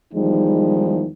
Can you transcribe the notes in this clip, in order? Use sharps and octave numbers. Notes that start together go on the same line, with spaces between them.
E2 D#3 F3 G3 G#3 D#4